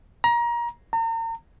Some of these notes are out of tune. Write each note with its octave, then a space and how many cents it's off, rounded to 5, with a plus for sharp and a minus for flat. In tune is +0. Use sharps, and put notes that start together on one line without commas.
A#5 +25
A#5 -40